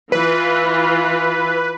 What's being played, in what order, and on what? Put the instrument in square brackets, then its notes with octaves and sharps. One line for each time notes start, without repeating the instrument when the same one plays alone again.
[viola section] E3 F4 [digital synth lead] B4